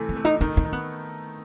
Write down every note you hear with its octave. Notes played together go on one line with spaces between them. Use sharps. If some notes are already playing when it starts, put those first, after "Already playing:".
Already playing: C3 E3 A3
C4
A3
D#4
D#3 D#4
D#4
D#3
B3